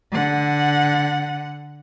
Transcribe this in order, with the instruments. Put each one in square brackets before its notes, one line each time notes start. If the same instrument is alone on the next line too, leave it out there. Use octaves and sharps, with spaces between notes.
[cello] D3 F#5